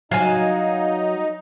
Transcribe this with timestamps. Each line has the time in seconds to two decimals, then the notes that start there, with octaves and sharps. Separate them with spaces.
0.11 F#3 D#4 F5 G#5